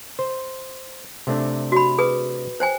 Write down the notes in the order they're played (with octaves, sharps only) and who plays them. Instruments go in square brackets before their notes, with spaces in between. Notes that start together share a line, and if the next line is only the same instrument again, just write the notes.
[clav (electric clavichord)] C5
C3 A3 D4
[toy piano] F#4 B5
G#4 B4 D#6
C5 G5 G#5